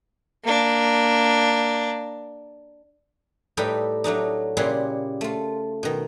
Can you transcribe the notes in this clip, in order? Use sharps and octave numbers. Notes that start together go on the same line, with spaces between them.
A#3 D4
A2 G3 D#4 A4 B4 G5
F#3 A3 D4 D#4
A#2 C#3 G3 E4 F#5 C6
A3 F4
B2 D#3